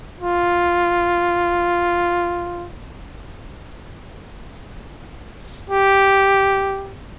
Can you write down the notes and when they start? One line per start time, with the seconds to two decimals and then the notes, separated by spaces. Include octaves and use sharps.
0.20 F4
5.70 G4